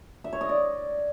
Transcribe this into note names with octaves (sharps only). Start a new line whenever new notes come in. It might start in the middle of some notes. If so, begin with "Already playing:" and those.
E5
C#5
D#5
D5